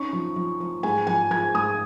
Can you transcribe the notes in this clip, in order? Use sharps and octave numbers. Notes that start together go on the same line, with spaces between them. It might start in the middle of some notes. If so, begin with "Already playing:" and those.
Already playing: C#4 D#4 C#6
F3
F3
F3
G#2 G#5
F3 G#5
F3 G#6
G#2 D#6